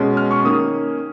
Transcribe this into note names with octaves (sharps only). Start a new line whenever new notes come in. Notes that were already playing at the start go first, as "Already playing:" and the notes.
Already playing: B2 G#3 C#4
F6
C#6
D#3 A#3 C#4 D#6